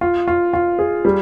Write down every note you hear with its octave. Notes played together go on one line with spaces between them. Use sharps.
F4
F4
F4
G#4
G3